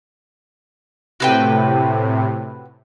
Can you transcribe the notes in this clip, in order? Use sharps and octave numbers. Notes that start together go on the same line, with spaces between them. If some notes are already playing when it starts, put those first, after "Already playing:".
A2 C3 F#4 B4 G5